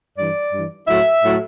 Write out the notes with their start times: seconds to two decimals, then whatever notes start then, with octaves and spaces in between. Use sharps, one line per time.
0.17 G2 E3 D5
0.52 G2 E3
0.87 A2 F#3 E5
1.24 A2 F#3